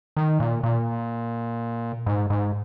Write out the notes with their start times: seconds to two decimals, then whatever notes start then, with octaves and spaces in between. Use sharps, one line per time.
0.17 D#3
0.40 A#2
0.63 A#2
2.06 G#2
2.30 G#2